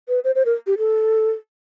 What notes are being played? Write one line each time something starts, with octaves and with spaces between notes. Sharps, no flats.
B4
C5
C5
A#4
G4
A4